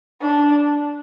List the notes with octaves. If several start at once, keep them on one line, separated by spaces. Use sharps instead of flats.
D4